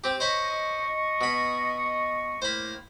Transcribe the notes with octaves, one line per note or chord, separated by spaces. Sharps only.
C4 G4
C5 C#5 D#5 B5 C#6
B2 B5
A2 A3 A#3 C5 B5